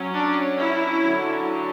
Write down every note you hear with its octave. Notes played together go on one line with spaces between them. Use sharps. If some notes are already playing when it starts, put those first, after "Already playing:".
Already playing: F#3 C#4
D4
E4
D3 F#3 C#4